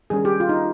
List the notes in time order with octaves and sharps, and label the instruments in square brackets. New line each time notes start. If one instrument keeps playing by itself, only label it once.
[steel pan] D#3 G3 C#4 G#4
G4
F4
D#4